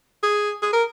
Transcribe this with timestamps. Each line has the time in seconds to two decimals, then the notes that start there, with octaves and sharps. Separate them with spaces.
0.23 G#4
0.62 G#4
0.73 A#4